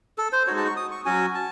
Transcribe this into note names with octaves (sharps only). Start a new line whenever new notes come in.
A4
C5
G#3 D#4 F#4 C#5
A5
C#6
D#6
C#6
F#3 C#4 F#4 G#5
A5